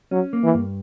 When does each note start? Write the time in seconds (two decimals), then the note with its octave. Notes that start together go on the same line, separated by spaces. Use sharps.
0.11 F#3 C#4
0.33 A#3
0.43 E3
0.54 G2